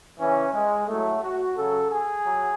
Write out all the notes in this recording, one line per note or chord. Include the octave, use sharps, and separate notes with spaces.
C#3 E3 C#4
G#3
A2 F#3 A3
F#4
C#3 F#3 A4
G#4
F#3